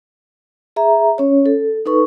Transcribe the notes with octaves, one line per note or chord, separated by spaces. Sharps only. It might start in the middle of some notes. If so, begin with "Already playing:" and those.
G#4 E5 A#5
C#4 C#5
A4
D#4 A4 B4 C#6